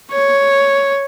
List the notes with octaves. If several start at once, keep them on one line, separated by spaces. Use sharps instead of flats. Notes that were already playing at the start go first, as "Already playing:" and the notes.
C#5